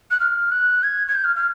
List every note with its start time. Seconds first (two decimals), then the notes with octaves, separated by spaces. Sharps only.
0.11 F#6
0.20 F6
0.52 F#6
0.83 G#6
1.08 G#6
1.15 G6
1.24 F6
1.36 F6